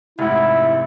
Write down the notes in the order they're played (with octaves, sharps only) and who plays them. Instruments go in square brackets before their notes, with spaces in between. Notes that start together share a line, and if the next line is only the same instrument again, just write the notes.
[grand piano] F1 G#2 F#5 [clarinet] E4 [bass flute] E5